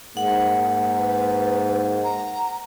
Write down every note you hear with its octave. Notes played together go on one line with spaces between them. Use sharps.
G#2 A#3 F#5
B4
A#5